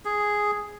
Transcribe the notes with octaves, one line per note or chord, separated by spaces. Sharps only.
G#4